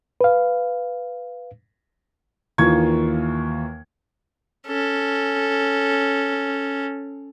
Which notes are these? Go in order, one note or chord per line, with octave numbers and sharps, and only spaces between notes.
B4 F5
D#2 E3 A#3 F4 C#6 G#6
C#4 A4